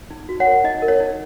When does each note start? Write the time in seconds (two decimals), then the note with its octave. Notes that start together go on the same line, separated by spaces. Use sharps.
0.11 D#4
0.29 F#4
0.40 C#5 F#5
0.47 A#4
0.64 D#4 D#5
0.82 A#4
0.88 C#5
1.00 D#4